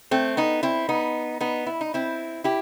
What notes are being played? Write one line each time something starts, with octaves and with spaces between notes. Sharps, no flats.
A3 C4
B3 D#4
C4 E4
B3 D#4
B3 D#4
E4
D#4
C4 E4
E4 G4